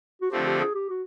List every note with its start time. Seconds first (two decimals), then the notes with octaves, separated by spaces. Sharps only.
0.22 F#4
0.31 D3 F3 A3 C4 G4
0.46 G4
0.60 G#4
0.74 G4
0.90 F#4